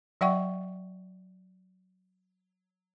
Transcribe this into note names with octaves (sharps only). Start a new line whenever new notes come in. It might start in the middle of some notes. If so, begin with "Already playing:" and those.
F#3 D5 E5 F#5 G5 C#6